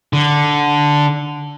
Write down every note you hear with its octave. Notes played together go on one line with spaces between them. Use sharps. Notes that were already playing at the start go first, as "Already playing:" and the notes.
D3